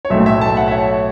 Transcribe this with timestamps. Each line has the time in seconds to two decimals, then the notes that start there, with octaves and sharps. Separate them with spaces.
0.05 C#5
0.10 B1 A2 A3 E5
0.26 E5
0.41 A5
0.50 E5
0.57 F#5
0.68 E5
0.71 C#5